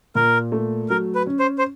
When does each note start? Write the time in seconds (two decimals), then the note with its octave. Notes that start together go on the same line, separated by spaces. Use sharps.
0.15 A#2 A#4
0.52 A3
0.90 F#3 A#4
1.15 B4
1.27 C#4
1.39 C5
1.58 C5